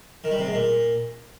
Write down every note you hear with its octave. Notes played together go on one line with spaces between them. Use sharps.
D#3
G3
C3
G#2
A#2